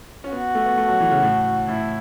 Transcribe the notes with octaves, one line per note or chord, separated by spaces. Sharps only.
C#4
B3 F#4
A3
B3
A3
F#3
E3
C#3
A2
A2 E4